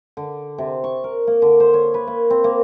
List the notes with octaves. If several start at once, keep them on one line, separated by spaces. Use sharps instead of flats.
D3
C3
C#6
A#4
A#3
D3
C5
C#5
B4
A#3
C4
A#3